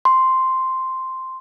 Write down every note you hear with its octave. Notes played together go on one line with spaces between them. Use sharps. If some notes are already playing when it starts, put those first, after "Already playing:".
C6